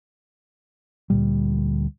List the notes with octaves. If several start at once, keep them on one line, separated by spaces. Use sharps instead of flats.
D2 A#2 G3